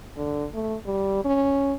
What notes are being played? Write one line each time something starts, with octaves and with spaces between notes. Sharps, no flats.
D3
A3
G3
C#4